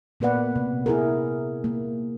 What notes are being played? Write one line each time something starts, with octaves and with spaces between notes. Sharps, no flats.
A#2 A#3 B3 B4 D5 F#5
C3
E4 G#4 A#4
A#3